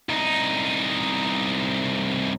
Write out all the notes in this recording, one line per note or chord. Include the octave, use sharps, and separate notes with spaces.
C2 D#4